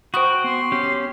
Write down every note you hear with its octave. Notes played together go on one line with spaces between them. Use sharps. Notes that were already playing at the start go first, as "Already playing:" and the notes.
F#4 C5 G5 B5 C#6 D#6 F#6
B3 C6
C#4 G4